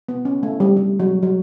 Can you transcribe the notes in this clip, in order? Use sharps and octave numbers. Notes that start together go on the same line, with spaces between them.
B3
C#4
A3
G3
G3
F#3
F#3